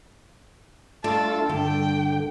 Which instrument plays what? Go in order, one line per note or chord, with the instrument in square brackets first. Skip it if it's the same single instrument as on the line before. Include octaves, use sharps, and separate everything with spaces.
[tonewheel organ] A3 F4 [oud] D4 [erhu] A4
[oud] G2 A4 [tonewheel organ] D3 [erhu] G5